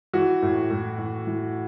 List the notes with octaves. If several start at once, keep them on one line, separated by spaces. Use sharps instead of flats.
E3 F#4
A2
A2
E3
E3